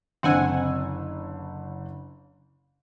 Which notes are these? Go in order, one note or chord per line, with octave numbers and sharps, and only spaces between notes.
F#1 D3 C4 F#5 G#5 E6